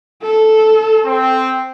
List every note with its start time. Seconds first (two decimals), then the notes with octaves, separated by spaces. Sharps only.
0.21 A4
1.05 C4